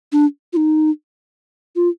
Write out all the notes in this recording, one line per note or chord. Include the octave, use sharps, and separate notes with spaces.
D4
F4
D#4
F4